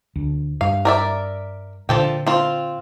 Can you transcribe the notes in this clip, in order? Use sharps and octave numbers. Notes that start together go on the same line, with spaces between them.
D2
G2 F5
A#4 D5 E5
A#2 D3 F3 A4 G5
C4 F4